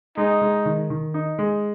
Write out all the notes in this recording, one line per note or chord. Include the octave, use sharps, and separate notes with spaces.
G#3 D#4
G#3
D#3
D#3
D#4
G#3